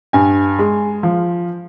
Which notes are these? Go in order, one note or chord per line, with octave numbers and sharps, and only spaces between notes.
G2 G#5
G#3
F3